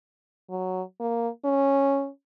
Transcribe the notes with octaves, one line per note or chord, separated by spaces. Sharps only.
F#3
A#3
C#4